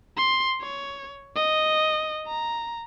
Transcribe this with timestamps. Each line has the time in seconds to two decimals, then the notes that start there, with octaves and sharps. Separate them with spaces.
0.17 C6
0.61 C#5
1.36 D#5
2.27 A#5